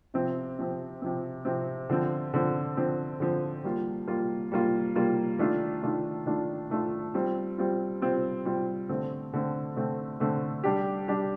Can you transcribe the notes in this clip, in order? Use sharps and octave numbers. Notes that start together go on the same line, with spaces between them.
C3 F3 C4
C3 F3 C4
C3 F3 C4
C3 F3 C4
D3 F3 C4
D3 F3 C4
D3 F3 C4
D3 F3 C4
G3 A#3 F4
G3 A#3 F4
G3 A#3 F4
G3 A#3 F4
D#3 A3 D4 F4
D#3 A3 D4 F4
D#3 A3 D4 F4
D#3 A3 D4 F4
G3 C4 F4
G3 C4 F4
G3 C4 F4
G3 C4 F4
D3 A3 C4
D3 A3 C4
D3 A3 C4
D3 A3 C4
G3 D4 G4
G3 D4 G4